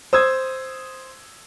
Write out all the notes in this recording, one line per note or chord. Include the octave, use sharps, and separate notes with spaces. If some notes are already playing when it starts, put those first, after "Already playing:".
C5 D#6 E6 G#6